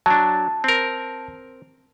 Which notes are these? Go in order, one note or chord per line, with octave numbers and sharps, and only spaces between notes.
F#3 D4 A5
C4 A#4